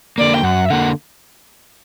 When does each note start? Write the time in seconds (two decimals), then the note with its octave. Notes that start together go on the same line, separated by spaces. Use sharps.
0.18 D3 A#3 D5
0.34 G5
0.43 F#2 F#5
0.65 E5
0.70 D3 A#3 F#5